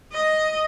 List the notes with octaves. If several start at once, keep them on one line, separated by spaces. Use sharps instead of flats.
D#5